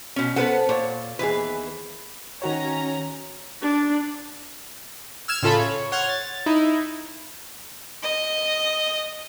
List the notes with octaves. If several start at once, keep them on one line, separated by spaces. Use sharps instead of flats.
B2 C#4
B3 A4 B4 C5 F#5
A#2 C#5
D#2 E3 B3 G#4 B4
D#3 C#4 F#4 C#5 A#5
D4
E6 F6 G#6 E7
A2 C#3 F4 A4 E5 B5
C#5
C#5 F#5 C6 F6 G#6
A6
D#4 E4
D#5